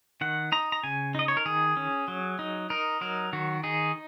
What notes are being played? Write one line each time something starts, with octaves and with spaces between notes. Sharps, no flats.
D#3 F#5
D#4 A#5
A#5
C#3 G#5
D#4 D#5
C#5
A#4
D#3 G#4
C#4
F#3
D#4
D#4 A#4
F#3 A#4
D#3 F#4
D#4 G#4